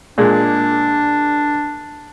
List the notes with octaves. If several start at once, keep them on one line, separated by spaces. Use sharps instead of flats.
A#2 G#3 D4